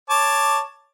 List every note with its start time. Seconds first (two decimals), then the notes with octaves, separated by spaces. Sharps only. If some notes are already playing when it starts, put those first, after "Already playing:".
0.10 C#5 A5 D6